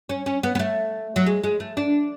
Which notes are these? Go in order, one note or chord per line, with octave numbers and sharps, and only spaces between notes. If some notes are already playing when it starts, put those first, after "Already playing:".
C#4
C#4
B3
B3
A3
F#3
G#3
G#3
A3
D4